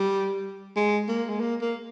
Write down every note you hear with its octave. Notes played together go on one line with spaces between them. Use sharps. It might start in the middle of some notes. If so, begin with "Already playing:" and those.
Already playing: G3
G#3
A#3
G#3
A#3
A#3